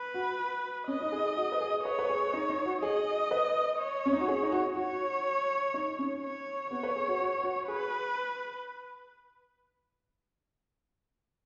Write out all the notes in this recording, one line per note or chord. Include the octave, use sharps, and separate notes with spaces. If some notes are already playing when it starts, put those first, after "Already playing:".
Already playing: B4
F#4
C#4 D#5
D#4
G#4
G#4
F#4
B4
G#4
B4 C#5
B4
G#4
D#4
D#4
F#4
G#4 D#5
B4
C#5
C#4
D#4
F#4
G#4
D#4
F#4
F#4 C#5
D#4
C#4
C#5
B3 C#5
B4
G#4
F#4
F#4
F#4
G#4 B4